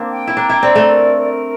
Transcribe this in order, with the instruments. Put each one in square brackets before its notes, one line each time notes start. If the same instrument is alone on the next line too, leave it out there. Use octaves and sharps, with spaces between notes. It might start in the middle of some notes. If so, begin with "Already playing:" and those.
Already playing: [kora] A#3 C4 D4
[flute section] G5
[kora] E4
[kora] D4 [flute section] A#5
[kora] E4
[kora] C4 [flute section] D5
[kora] A3
[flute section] A#4
A#4